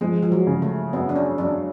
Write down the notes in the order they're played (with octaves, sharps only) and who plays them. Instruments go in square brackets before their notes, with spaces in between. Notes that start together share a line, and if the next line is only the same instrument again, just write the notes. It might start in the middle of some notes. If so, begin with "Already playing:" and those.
[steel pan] F3 [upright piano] G#3
[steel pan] F3
F#3
[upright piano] C#3
[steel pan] A3
[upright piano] F#2 [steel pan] B3
[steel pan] D4
C#4
[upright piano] F#2 [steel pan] D4